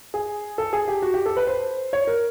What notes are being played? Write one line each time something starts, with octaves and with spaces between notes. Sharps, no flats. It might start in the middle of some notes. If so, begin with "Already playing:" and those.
G#4
A4
G#4
G4
F#4
G4
A4
B4
C5
C#5
A#4